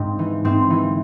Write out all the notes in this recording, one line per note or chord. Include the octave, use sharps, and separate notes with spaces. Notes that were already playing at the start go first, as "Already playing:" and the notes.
Already playing: G#2 C4 D4
E3
G#2 C4
E3